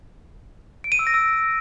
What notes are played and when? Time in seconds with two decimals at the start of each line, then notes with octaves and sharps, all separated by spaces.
0.84 D7
0.92 D#7
0.99 E6
1.07 A#6
1.14 E6